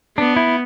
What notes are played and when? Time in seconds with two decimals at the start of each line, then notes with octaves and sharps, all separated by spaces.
0.18 B3 D4
0.36 E4